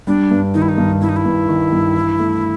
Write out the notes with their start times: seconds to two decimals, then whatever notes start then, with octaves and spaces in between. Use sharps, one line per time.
0.07 G3 D4
0.31 G2
0.54 D#3 D#4
0.62 E4
0.69 D#4
0.78 G2
1.01 G3 E4
1.09 D#4
1.16 E4
1.25 G2
1.49 D#3
1.72 G2
1.96 E3
2.19 A3